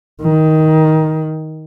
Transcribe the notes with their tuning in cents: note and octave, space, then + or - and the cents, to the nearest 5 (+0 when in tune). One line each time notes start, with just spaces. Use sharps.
D#3 +15